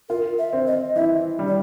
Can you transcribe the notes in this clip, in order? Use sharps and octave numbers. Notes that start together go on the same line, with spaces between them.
F4 A#4
E5
C4
D#5
E3 E5
G3
D5